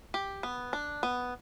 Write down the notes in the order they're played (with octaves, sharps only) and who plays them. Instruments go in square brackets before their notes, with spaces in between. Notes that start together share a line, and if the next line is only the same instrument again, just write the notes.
[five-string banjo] G4
B3
D4
B3